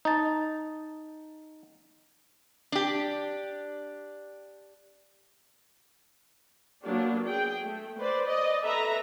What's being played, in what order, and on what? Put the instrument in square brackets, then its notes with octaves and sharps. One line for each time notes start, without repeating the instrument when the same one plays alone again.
[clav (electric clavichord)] D#4 A5
[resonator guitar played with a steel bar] D4 G4
[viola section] F#3 A#3 B3 D4 G4
G#4 G5
A3
B4 C5 D5
D5 D#5
A4 B4 E5 A#5